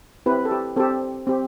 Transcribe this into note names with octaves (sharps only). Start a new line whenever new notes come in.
C4 E4 G4 B4
A4
G4
C4 G4 A4
C4 G4